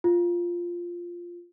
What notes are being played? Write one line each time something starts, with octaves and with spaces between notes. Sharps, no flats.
F4